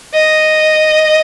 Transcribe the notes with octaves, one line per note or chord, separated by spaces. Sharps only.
D#5